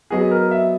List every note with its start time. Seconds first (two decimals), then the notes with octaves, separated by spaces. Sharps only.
0.10 F#3 B3 F#4 G#4 B4 D#5
0.31 A#4
0.51 E5